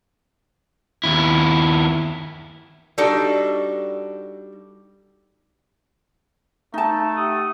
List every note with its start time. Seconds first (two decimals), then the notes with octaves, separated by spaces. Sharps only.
1.04 D#2 E4
2.98 G3 D4 D#4 F#4 A4
6.74 A3 D#4 A5
7.16 G4 F#5 D#6